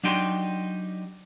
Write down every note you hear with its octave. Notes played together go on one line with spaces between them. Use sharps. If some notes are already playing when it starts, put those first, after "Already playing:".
F#3 D4 D#4 G4 G5 C6